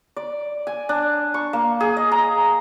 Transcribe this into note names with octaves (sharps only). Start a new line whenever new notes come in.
D5
G#5
D4
C#6
A#3
G#4
D#5
A#5